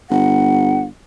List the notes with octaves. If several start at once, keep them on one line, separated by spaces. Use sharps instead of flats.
G1 F#5